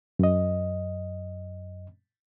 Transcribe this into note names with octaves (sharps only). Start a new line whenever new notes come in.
F#2 D#5